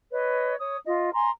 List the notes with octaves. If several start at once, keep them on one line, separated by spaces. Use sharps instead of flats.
B4 C#5 D#5
C#5 D#6
F4 D#5
G#5 A#5 C6